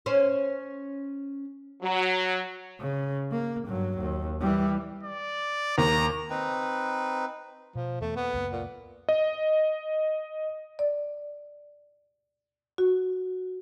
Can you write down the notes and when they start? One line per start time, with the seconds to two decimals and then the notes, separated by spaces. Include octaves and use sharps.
0.06 C#4 C5
1.83 F#3
2.80 C#3
3.32 A#3
3.66 G2 F#3
4.00 D#2
4.40 E3 G3
5.03 D5
5.78 D#2 A#5
6.30 C4 D#4 B4
7.75 B2 F3
8.01 E2 E3 A3 B3
8.16 A#3 B3
8.33 C#2 F#2 A#3
8.52 A#2
9.09 D#5
10.79 D5
12.78 F#4